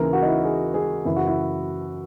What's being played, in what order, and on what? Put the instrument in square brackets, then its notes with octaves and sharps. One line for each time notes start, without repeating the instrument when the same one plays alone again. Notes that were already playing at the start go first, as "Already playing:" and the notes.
Already playing: [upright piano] D#2 C#3 E3 A#4
F#4
D#4
E4
G#4
G#4
F#2 C#3 E3 E4
F#4
E4